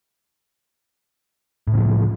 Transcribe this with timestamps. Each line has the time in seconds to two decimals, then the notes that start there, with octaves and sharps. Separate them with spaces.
1.68 A2
1.72 C#3
1.77 F3